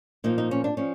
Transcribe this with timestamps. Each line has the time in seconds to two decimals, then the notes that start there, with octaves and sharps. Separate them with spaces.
0.24 A#2 F3 D#4
0.38 D#4
0.51 C#4
0.64 D4
0.77 F3 C#4